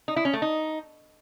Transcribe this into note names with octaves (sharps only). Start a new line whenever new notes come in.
D#4
E4
C#4
A3
D#4